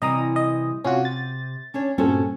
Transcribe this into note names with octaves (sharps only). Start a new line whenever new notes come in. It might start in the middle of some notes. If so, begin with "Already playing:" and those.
C3 E3 G3 D#5 A#5 D#6
D#5
C3 C#4 F4 F#4
A6
C#4 D4 C#5
G2 A#2 C4 C#4 F#4 A4